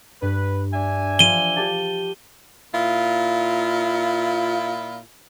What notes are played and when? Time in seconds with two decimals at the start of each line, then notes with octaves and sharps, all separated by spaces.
0.22 G2 B4
0.74 D4 E5 G#5
1.19 F3 D#7 G7
1.56 G4 A5 A6
2.74 A#2 E4 F4